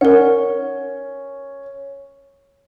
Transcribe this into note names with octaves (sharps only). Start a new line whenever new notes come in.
C#4 A#4 F#5